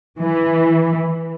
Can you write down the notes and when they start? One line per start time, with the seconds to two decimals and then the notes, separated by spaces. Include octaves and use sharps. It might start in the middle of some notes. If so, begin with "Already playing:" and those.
0.21 E3